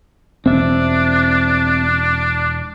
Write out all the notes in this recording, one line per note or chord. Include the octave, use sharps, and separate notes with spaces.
E1 C4 D4 E5